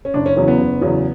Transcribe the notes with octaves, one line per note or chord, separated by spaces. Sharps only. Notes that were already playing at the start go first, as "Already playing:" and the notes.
C#4
F#1 D4
C#4
E2 C#3 F#3 C#4
B3
F#1
E2 C#3 F#3